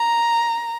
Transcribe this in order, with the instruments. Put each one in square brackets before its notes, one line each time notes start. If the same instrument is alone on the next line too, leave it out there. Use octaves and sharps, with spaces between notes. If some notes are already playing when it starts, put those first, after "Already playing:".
Already playing: [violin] A#5